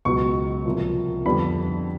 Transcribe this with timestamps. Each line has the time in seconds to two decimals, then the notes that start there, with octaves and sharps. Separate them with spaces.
0.05 C#2 B2 F#3 C#6
0.65 C2 A#2 F3
1.26 F2 D3 G3 B3 D4 B5